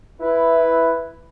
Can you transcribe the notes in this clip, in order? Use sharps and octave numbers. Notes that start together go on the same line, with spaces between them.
E4 B4